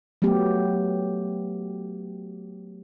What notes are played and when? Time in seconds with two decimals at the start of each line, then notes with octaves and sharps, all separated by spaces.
0.22 F#3 A3 B3 G4